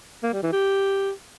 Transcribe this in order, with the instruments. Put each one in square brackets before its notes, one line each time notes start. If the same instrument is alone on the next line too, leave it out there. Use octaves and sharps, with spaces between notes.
[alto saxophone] A#3
G3
E3
G4